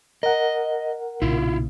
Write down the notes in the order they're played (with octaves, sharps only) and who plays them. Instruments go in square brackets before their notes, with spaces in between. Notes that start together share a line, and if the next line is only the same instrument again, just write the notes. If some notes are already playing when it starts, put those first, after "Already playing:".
[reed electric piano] A#4 F#5 [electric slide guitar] D#5
[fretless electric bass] B1 A#2 C#3 [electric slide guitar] E4 F4